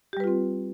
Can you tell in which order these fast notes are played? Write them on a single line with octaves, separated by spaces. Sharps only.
G4 G3 B4 F4 C4